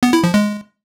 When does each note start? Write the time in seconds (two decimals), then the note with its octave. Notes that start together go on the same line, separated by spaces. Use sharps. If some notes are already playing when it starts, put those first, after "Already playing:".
0.03 B3
0.13 E4
0.24 F3
0.34 G#3